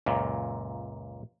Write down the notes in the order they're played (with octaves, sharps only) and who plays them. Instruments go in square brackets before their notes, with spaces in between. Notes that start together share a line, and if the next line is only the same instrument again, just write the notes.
[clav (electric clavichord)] C#2 F#2 A#2